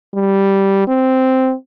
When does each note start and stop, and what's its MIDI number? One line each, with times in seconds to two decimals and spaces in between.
0.14 0.87 55
0.87 1.54 60